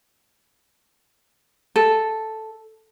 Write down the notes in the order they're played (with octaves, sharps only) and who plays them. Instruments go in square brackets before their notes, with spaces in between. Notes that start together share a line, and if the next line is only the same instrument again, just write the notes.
[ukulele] A4